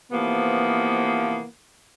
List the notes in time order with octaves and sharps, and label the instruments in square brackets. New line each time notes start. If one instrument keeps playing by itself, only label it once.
[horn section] C3 E3 F3 A#3 B3